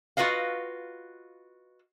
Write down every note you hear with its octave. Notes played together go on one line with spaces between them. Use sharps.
F4 F#4 B4 D#5 F5